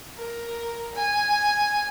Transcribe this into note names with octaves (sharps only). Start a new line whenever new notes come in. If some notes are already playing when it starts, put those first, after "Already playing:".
A#4
G#5